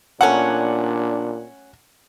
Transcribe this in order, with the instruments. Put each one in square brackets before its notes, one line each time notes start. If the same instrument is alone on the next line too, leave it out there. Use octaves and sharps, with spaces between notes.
[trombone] A#2 [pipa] F#3 A3 C#4 [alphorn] D4 [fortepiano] F#5